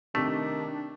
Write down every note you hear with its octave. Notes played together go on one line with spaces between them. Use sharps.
C3 D#3 A3 D4 G4